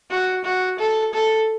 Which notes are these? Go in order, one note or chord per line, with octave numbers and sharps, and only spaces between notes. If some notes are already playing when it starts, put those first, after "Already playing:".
F#4
F#4
A4
A4